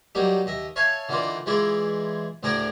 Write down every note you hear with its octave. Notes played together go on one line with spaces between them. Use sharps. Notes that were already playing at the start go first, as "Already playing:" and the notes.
F#3 G3 A#3 D#4 G4
D#2 D#5 E5
C#5 E5 F5 G#5 A5
D3 E3 A#3 D#4 F4 D5
E3 G#3 F4 G#4 D5 E5
D2 A2 D3 G#4 A#4 D6